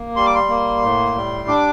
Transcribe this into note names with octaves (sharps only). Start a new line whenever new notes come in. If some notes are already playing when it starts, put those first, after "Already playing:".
Already playing: A#3
G3 C6
D6
C6
A#3
A2
G3
D4 D6